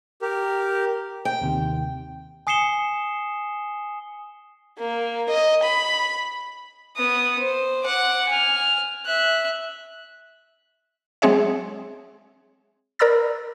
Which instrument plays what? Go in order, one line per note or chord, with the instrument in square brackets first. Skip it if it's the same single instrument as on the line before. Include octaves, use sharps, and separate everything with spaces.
[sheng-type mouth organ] G4 A#4
[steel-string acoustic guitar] G5
[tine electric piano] D#2 C3 D#3
[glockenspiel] G#5 D#6 C7 C#7 E7 G7
[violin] A#3
D#5
B5
[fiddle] B3 D#6
C5
F#5 D6
G#5 F6
E5 F#6
[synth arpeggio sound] F#3 G#3 C4 G#4 C#5 E5
A#4 D5 A#5 B5 E6 A6